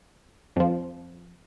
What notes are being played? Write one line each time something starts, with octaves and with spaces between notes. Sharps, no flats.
F2 F3